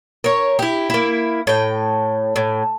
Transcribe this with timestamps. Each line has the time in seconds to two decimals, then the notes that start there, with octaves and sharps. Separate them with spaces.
0.24 A#4 C#5
0.59 E4 G4
0.90 A#3 E4
1.47 A2 G5
2.36 A2